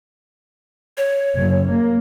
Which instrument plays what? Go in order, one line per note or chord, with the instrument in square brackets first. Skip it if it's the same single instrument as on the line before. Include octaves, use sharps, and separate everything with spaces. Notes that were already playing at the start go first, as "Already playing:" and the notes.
[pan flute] C#5
[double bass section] F#1
A#3